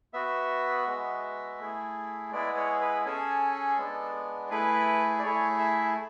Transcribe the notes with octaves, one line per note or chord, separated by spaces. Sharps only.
B3 F#4 E5
G#3 B3 F#4
A3 E4 G#4
G#3 B3 E4 G#4 D5
C#5
B4
C#4 G#4 A4
G#3 B3 D4
A3 E4 G#4 B4
D5
A3 E4 G#4 C#5
E5